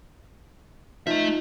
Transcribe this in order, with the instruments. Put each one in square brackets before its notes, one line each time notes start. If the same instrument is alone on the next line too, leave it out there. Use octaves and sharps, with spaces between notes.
[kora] F3 [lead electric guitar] A3 E5 [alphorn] D#4